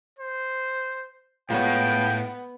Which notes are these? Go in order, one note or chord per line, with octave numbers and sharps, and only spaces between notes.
C5
A2 G#3 B3 F4 C#5 G5